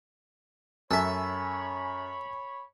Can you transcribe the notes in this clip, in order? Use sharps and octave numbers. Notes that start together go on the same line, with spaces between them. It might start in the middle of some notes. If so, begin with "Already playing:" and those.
F#2 A4 C#5 E5 G#5 B5